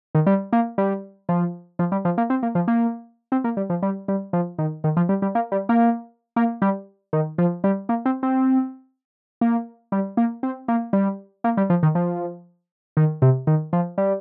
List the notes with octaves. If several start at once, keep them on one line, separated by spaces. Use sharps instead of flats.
D#3
G3
A#3
G3
F3
F3
G3
F3
A#3
C4
A#3
F3
A#3
C4
A#3
G3
F3
G3
G3
F3
D#3
D#3
F3
G3
G3
A#3
G3
A#3
A#3
G3
D#3
F3
G3
A#3
C4
C4
A#3
G3
A#3
C4
A#3
G3
A#3
G3
F3
D#3
F3
D#3
C3
D#3
F3
G3